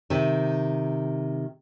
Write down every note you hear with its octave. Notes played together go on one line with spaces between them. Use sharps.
C3 D#3